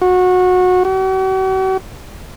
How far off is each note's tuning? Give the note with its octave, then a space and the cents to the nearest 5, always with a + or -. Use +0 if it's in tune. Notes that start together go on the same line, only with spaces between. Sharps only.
F#4 -20
F#4 +45